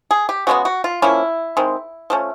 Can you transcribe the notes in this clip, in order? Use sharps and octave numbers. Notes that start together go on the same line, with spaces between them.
G#4
G4
C#3 E3 G#3 B3 F#4
F#4
F4
F3 A#3 C#4 E4
D#3 G#3 C4
F3 A3 C#4